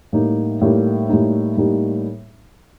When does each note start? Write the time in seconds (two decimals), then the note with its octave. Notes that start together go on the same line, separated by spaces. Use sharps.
0.13 A2 G3 A#3 D#4
0.61 A2 G3 A#3 D#4
1.09 A2 G3 A#3 D#4
1.57 A2 G3 A#3 D#4